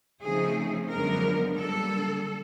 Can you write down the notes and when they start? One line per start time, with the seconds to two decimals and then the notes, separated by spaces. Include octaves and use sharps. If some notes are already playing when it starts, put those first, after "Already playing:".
0.23 C#3 F3 A3 C4 D#4 G#4
0.91 F#2 D3 F3 G#3 B3 A#4
1.59 D3 G3 A#3 A4